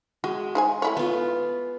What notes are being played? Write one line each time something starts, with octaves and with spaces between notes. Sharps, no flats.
G#3 F#4
D#4 C5 G#5
A3 E4 C#5
B3 F4